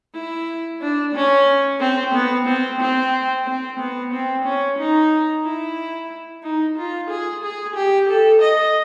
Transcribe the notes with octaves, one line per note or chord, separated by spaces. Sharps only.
E4
D4
C#4
C4
B3
C4
C4
C4
B3
C4
C#4
D#4
E4
D#4
F4
G#4
G#4
G4
A4
D#5